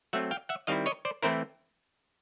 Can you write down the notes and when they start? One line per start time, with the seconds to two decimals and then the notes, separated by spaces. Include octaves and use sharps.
0.13 F#3 A3 C4 E5 F#5
0.31 F5 G5
0.49 E5 F#5
0.67 D#3 G3 C4 E4 D#5 F5
0.86 C#5 D#5
1.05 C5 D5
1.23 E3 A3 C4 E4 A#4 C5